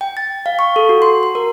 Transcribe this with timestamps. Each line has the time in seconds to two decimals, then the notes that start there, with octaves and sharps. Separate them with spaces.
0.01 G5
0.17 A6
0.46 F5
0.59 C#6
0.76 A4
0.89 F#4
1.02 C6
1.23 C6
1.35 A#4